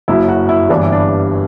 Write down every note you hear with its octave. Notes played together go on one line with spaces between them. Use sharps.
F#1 F#2 F#3 E4
F#4
E4
G1 G2 E3 G3 D4
E4
D4